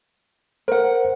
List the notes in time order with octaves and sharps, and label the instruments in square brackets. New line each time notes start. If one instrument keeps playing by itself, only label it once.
[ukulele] A#4 F#5 [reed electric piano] C5